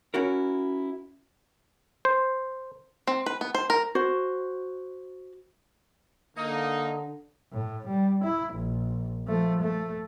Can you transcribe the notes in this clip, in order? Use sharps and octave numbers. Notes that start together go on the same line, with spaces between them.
C#4 E4 F#4 A#4
C5
C4
B4
B3
C5
A#4
F#4 C5
D3 A#3 D#4
A2
G3
E4
A#1
F3 A3
A3